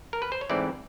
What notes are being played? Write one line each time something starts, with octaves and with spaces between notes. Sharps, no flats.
A#4
B4
C5
C#5
G#2 E3 A3 C4 E4 D5